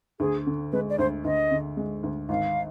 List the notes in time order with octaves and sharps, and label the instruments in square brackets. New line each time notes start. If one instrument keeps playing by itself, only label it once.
[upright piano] D2 [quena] G#4
[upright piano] D3
[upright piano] G#3 [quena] B4
[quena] D5
[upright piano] D2 [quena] C5
[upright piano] D2 [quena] D#5
[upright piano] D3
G#3
D2
[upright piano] G#1 [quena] F5